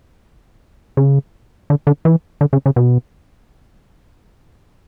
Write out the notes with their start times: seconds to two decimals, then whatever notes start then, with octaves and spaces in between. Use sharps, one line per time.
0.97 C#3
1.70 D3
1.87 D3
2.05 E3
2.41 D3
2.53 C#3
2.66 C#3
2.76 B2